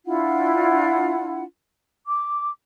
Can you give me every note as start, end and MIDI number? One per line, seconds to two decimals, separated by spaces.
0.06 1.43 62
0.06 1.43 64
0.06 1.43 65
0.06 1.43 78
2.07 2.47 86